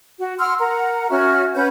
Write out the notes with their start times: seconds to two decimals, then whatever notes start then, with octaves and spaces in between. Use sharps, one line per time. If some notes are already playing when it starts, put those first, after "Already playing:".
0.18 F#4
0.39 F#5 C6 E6 F6
0.58 A#4 F#5 A#5
1.10 C#4 F#4 E5 F6
1.55 C#4 B4 F#5 G6